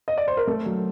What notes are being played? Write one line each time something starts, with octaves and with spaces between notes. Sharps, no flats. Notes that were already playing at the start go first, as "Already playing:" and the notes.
D#5
D5
C5
A#4
A3 A4
F#3